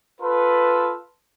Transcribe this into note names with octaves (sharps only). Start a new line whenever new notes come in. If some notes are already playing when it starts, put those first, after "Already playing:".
F4 A4 B4